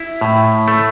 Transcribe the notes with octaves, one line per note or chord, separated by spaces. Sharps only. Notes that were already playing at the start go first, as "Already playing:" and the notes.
Already playing: E4
A2
A3